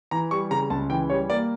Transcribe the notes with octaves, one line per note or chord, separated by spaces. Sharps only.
E3 A#5
G3 C#6
C#3 A#5
C#2 A5
E3 G5
G3 C#5
A#3 D5